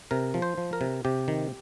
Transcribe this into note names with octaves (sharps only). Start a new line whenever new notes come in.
C3 A#4
F3
C5
F3
A#4
C3
C3 G4
D#3